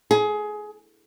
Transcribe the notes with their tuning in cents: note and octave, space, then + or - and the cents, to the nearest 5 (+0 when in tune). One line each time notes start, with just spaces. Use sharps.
G#4 +20